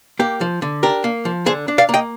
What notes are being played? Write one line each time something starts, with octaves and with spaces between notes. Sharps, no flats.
A#3 G4
F3
D3
D4 G4 A#4
A#3
F3
D3 G#4 C5
D4
D5 F5
A#3
D#5 G5